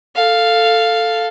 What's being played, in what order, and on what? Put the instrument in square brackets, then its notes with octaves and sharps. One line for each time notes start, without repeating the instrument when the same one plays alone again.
[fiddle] A4 F5